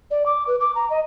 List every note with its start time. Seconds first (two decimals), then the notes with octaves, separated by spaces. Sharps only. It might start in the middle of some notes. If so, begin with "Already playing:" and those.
0.11 D5
0.26 D6
0.47 B4
0.60 D6
0.75 A#5
0.90 D#5